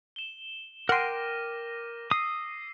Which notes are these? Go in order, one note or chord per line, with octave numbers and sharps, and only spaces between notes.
E7 G7
A#4 F#5 G5 C6 D6 A#6 D#7
D#6 E6 C7